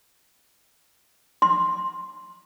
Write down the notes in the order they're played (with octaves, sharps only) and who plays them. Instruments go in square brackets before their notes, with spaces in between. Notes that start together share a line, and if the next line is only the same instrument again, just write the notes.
[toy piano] C6